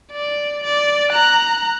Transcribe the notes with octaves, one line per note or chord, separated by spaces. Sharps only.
D5
D5
A#5 F#6